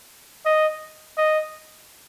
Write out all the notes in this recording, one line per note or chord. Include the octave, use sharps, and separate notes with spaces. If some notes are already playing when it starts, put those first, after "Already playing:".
D#5
D#5